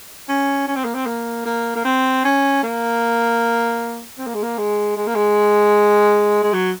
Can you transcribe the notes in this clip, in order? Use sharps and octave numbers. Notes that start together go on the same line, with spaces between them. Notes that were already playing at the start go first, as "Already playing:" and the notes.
C#4
C#4
C4
A#3
C4
A#3
A#3
A#3
C4
C#4
A#3
C4
A#3
G#3
A#3
G#3
G#3
A#3
G#3
G#3
F#3